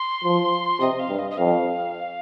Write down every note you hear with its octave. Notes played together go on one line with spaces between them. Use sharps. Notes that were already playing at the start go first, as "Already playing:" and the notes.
Already playing: C6
F3
C3 D#5
F5
G2
D#5
D#5
F2 F5